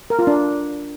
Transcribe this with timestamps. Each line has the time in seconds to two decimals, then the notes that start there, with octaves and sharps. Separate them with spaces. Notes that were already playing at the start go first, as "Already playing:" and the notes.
0.10 A#4
0.19 F4
0.27 D4